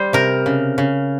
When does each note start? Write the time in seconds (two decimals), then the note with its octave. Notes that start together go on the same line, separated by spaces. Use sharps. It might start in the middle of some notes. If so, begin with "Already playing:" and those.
Already playing: G3 C5
0.13 C3 A#4
0.46 C#3
0.78 C#3